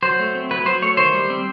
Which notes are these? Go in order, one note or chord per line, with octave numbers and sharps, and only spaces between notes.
F#3 C5
A3
C4
F#3 B4
F#3 C5
A3 C#5
D#3 C5
G3
C4